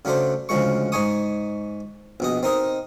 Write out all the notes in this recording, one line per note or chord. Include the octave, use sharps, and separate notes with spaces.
C#3 F#3 A3 D4 C5
D2 C#3 F3 G#3 C#6
G#2 D#4 G#5 C#6 D#6
A#1 B2 D#5
C4 D#4 A#4 D#5